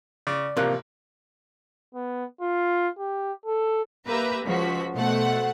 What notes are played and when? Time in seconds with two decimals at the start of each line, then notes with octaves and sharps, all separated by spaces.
0.27 C#3 D5
0.57 A1 C3 F3 A#3 F#6
1.95 B3
2.41 F4
2.99 G4
3.46 A4
4.07 A#3 G4 B4 E5 A#5
4.45 C#2 F3 F#4 B6
4.94 B2 A3 C5 F#5